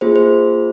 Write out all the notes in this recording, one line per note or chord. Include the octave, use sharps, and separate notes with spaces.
A#3 F4 G#4 C5
C5